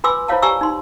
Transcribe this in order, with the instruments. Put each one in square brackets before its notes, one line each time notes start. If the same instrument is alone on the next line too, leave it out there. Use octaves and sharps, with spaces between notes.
[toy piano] F4 B4 G#5 C6 D6 E6
E4 F4 C5 C#5 F5 A5
G4 D5 G#5 A#5 C#6 E6
D#4 C6